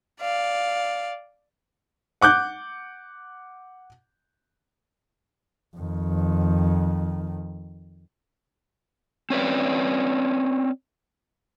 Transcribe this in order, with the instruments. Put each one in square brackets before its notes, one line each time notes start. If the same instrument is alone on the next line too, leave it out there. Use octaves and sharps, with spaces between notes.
[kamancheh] D5 F5
[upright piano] F#5 D6 F#6 G6
[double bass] F2 D#3
[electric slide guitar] C4 C#4 B4 D5